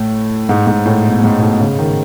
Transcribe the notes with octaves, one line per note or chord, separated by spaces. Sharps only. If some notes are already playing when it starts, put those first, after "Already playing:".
Already playing: A2
G#2
G#2
A2
B2
G#2
B2
A2
C#3
D#3